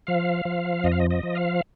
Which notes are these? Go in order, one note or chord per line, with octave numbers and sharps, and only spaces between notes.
F3 F5
F3
F2 D#5
F5
D#5
D#5
F3
F5